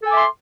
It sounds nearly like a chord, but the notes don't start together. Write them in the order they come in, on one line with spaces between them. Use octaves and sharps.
A4 G#5 D6 E5 C6